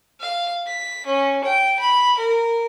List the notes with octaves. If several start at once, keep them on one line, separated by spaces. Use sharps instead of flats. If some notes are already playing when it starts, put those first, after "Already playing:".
F5
B6
C#4
G5
B5
A#4